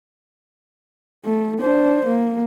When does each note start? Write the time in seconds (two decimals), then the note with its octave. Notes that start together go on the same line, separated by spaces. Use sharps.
1.25 A3
1.60 D4 C5
2.06 A#3